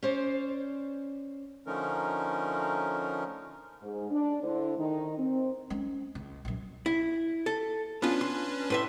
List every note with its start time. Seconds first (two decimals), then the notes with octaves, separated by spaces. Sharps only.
0.03 C#4 C5 D5
1.67 D3 F3 A3 C#4 D#4 A#4
3.82 G#2
4.11 D4
4.43 D3 A3 E4 C5
4.78 D#3 D#4
5.18 C4
5.70 G#3 C#4
6.15 C#2
6.45 A#1 F#2
6.86 E4
7.46 A4
8.02 B3 C#4 D4 F4 B4
8.21 C6
8.70 A2 B4 E5 C6